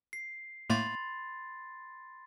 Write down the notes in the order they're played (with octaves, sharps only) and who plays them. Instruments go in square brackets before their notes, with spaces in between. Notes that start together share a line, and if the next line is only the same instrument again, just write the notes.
[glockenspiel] C7
[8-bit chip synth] A2 A3 A#3 [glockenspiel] B5 C6 A6